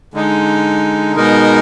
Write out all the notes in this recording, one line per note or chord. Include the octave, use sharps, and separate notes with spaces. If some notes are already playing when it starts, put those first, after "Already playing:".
D3 G#3 D#4
B2 G#3 D#4 A#4